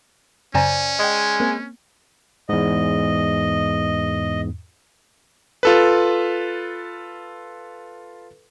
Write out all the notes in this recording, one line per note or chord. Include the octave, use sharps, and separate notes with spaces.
F#2 C#3 C#4 C5 D5 G#5 A#5
G#3 D#5 G5
A#3 C4
E2 G#2 D#5
F4 A4 B4